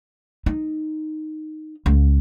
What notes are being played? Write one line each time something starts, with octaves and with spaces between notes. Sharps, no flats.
D#4
C#2